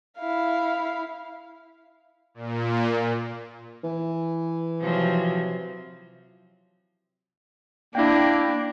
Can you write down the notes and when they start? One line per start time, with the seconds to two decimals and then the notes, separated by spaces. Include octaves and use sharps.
0.19 E4 F5
2.34 A#2
3.83 E3
4.81 C3 F3 F#3
7.95 A#3 D4 E4 G5